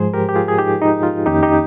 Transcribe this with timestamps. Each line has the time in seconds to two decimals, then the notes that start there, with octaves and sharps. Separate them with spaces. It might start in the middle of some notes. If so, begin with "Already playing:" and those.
Already playing: G#2 F3 G#3 G#4 C5
0.14 G4 A#4
0.29 G4
0.36 F4 G#4
0.48 G#4
0.58 D#4 G4
0.82 D#4
1.03 F4
1.26 F2 D#3 A#3 C#4 D#4 G4
1.43 D#4 G4